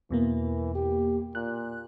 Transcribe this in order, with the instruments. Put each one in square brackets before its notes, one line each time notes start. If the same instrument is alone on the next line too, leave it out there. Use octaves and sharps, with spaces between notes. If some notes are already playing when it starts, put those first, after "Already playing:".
[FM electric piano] E2 B2 A#3 [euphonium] E3
[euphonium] G4
[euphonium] A#2 [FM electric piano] F#6